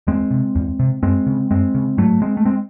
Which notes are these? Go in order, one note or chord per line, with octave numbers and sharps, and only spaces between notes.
E2 G#3 C4
C3
E2
C3
F#2 G#3 C4
C#3
F#2 G#3 C4
C#3
G#2 F#3 A3
G#3 C4
A3
G#3 C4